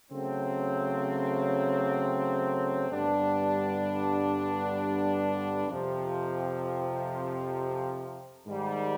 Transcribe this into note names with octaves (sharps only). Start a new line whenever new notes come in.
C#3 F#3 A3 C4
G2 D3 G3 B3 D4
F2 C3 F3
G#2 D#3 G3